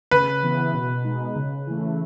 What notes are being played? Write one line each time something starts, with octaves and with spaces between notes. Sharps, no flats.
C#3 B4
E3 B3 E4
B2
G#3 D#4
C#3
E3 A3